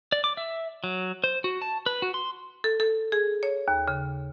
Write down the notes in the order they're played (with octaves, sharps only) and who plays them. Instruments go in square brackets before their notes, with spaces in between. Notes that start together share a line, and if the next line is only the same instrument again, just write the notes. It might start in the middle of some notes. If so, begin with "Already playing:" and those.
[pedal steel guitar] D5
D6
E5
F#3
C5
F#4
A5
B4
F#4
C6
[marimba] A4
A4
G#4
C#5
D#2
C#3